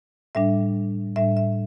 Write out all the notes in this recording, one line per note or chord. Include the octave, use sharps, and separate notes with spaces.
A2 G3 D4 E5
A2 G3 D4 E5
E5